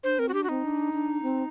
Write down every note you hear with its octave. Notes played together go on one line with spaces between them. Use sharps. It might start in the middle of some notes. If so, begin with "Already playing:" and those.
D4 C5
C4 A#4
F#4
D4 G4
F#4
C4 D#4
D4
D4
C4